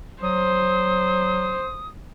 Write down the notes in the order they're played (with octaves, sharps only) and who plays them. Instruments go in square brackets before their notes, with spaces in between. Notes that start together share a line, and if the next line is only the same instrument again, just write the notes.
[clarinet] F#3 [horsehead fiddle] C5 [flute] D#6